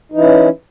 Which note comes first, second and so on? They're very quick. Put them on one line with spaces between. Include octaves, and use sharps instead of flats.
D#4 E3 E4 C#4